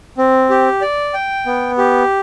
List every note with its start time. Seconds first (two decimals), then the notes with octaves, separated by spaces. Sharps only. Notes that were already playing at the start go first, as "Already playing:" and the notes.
0.18 C4
0.50 G4
0.82 D5
1.14 G5
1.46 B3
1.78 G4